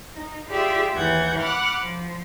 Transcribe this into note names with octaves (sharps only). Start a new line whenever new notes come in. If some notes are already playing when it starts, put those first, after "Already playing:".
D#4
F4 G4 G#4 D5 E5
D#2 E3 F#5 G6 G#6
F#5 B5 D6 F6 F#6
F3